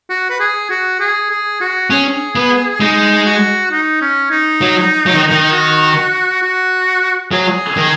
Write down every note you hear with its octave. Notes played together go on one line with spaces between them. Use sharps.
F#4
B4
G#4
F#4
G#4
G#4
F#4
C#4 G#4
B3
G#3 D#4
F#4
D#4
C#4
D#4
F#3
F#3
D#3
D#3
F#4
F#4
F#3 G#4
D#3